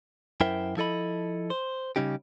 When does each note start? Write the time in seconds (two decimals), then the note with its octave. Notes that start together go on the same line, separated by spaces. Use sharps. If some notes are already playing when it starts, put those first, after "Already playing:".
0.41 F#2 E4 A#4 C5 E5 G5
0.77 F3 E4 A4 D#5 B5
1.50 C5
1.96 C#3 G3 C#4 D#4 G4